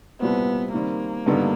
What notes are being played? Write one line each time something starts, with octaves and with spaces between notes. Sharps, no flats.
C2 A#2 G3 B3 C4
D#3 G3 A#3 C4
G2 D3 G3 B3 D#4